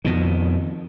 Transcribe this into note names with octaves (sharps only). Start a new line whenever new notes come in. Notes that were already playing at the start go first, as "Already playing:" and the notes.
F2 B2 D#3